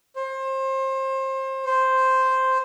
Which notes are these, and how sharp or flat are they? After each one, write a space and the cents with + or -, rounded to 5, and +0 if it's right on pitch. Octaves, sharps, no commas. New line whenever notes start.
C5 +30
C5 +0